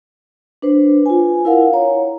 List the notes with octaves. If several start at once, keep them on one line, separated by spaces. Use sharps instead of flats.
D4 B4 C5
F4 G#5
E4 A#4 F5 F#5
C#5 A#5